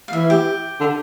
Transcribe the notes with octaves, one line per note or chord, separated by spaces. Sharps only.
F5
E3 E5
G4
D3